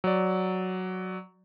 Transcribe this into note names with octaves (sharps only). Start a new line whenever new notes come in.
F#3 D5